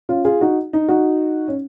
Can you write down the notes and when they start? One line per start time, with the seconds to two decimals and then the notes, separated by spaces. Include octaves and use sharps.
0.09 C#4 F4
0.25 F4 G#4
0.41 D#4 F#4
0.73 D#4
0.88 D#4 F#4
1.48 C#4